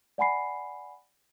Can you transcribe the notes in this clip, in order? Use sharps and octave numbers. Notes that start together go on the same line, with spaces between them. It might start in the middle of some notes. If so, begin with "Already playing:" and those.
D5 F#5 G#5 B5 C7